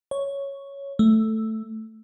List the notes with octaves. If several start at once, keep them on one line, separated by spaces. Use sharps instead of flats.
C#5
A3